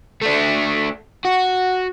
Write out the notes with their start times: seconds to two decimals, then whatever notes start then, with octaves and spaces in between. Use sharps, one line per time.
0.22 A3 D4
1.25 F#4